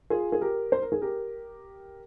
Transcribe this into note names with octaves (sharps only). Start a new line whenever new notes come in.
F4 G#4
G#4
G4 A#4
C5
A#4
G#4
G4 A#4